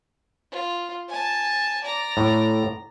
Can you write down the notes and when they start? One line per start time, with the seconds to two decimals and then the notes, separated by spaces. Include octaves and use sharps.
0.52 F4
1.09 G#5 A5
1.84 D5 A#5
2.17 A2